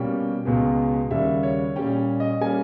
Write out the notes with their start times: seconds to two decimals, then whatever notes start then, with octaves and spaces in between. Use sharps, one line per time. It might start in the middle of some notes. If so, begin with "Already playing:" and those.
Already playing: B2 G3 A#3 C#4 G5
0.45 C#2 B2 G#3 B3
1.11 D#2 C#3 G3 E5
1.43 C#5
1.76 A#2 G3 C#4 G5
2.20 D#5
2.41 G3 A#3 C#4 G#5